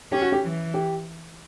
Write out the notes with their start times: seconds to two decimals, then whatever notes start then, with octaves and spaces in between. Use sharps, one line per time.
0.12 C#4 G4
0.22 F#4
0.32 G4
0.42 E3
0.74 G4